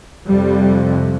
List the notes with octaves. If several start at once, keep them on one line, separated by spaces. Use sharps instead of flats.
F2 C3 G3